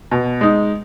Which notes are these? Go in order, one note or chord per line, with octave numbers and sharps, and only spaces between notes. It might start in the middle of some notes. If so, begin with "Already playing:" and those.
B2
G#3 D#4